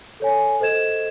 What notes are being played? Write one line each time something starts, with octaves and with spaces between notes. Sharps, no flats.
A4 C#5 G#5
A4 C5 D#5 G#6 E7